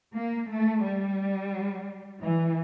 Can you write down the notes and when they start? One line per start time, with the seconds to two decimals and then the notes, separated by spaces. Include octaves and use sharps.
0.15 A#3
0.50 A3
0.84 G3
2.22 E3